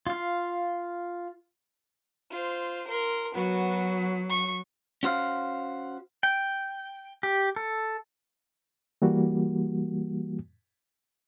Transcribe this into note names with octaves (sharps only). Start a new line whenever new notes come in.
F4 F5
F4 C5
A#4 C6
F#3 B3 F#4
C#6
C#4 F#4 C5 F5
G5
G4
A4
E3 G3 A#3 F#4